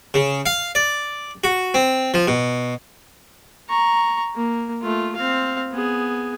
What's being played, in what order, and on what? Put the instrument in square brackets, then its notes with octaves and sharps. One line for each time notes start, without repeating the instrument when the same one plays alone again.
[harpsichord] C#3
F5
D5
F#4
C4
F3
B2
[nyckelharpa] A#5 C#6
A#3
A3 F4
C4 F5
B3 G#4